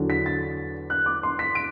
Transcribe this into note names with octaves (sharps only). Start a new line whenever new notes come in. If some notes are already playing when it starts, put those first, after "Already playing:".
Already playing: E2 D3 F#3
B6
A6
F#6
D6
C6
B6
D7